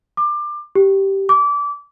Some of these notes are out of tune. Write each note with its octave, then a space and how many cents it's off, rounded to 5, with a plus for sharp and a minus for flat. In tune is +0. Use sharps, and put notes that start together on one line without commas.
D6 +25
G4 -10
D6 -25